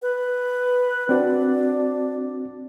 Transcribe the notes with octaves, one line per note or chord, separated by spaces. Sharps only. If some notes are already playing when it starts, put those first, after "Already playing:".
B4
C4 D4 F#4